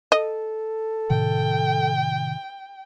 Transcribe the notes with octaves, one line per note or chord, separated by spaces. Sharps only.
A4 D#5
A2 C3 D#3 G5